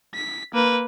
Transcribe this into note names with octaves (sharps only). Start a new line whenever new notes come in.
B6
A#3 B4